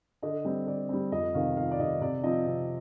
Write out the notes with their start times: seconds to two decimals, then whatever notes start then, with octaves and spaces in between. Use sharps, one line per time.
0.22 D3 D#5
0.45 G3 C4
0.67 D3 D5
0.89 G3 C4
1.12 F2 D#5
1.34 C3 D#3 F5
1.57 F2 F5
1.71 D5
1.79 C3 D#3 D#5
2.01 C3 D5
2.23 F3 C4 F4 D#5
2.46 C3